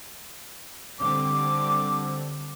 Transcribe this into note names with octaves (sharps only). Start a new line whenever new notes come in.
D3 G3 C4 D6